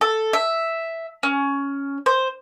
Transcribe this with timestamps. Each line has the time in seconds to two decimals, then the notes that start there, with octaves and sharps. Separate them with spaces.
0.01 A4
0.33 E5
1.23 C#4
2.06 C5